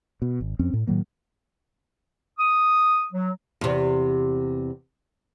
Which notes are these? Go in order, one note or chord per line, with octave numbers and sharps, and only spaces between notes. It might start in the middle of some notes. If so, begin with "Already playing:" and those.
B2
G#1
F2 C4 C#4
A2
A2 D#3 F#3 A#3
D#6
F#3
E2 C3